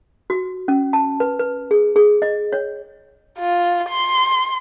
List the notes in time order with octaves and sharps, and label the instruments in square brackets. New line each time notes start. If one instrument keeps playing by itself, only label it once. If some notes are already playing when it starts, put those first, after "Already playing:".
[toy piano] F#4
C#4
A5
B4
B4
G#4
G#4
D#5
C#5
[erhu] F4
C6